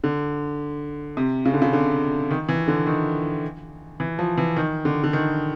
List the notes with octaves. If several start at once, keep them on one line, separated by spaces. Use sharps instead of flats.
D3
C3
C#3
D3
C#3
D3
D#3
E3
D3
D#3
E3
F3
E3
D#3
D3
D3
D#3